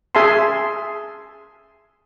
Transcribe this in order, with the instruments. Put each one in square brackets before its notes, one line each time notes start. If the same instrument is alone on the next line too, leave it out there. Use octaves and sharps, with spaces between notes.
[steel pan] G#4 E5 G#5 A5 C6